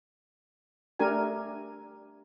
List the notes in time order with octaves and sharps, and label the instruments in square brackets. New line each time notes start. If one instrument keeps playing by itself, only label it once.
[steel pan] A3 D4 G4 A#4 G#5